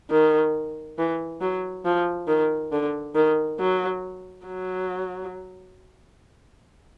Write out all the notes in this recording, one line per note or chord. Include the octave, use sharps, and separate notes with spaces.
D#3
E3
F#3
F3
D#3
D3
D#3
F#3
F#3